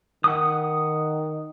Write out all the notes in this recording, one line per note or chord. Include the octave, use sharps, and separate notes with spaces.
D#3 F#5 D#6